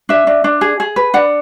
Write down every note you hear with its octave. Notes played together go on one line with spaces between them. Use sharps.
D4 E5
D4
D4
G#4
G#4
B4
D4 F#5